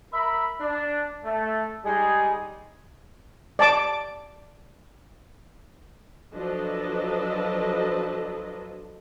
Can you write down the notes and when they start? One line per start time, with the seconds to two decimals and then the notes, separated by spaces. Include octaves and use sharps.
0.13 A#4 E5 B5
0.60 D4
1.24 A3
1.85 G3 G#3 D#4 G#4
3.59 D5 A5 D6
6.34 F3 F#3 D4 A4 B4 D#5